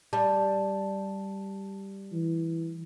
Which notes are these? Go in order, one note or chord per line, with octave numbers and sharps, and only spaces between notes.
G3 A5
E3